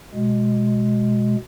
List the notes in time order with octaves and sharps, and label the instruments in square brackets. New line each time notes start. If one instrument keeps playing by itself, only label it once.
[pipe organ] B2 G#3